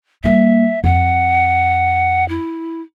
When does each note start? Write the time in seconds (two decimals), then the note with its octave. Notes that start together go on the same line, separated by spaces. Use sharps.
0.24 G3 A#3 E5
0.84 F2 F#5
2.29 E4